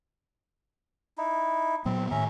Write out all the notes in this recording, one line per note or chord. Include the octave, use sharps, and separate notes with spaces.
D#4 E4
A#2 F#3 B3 C4
A2 D#3 C#4 E5 A#5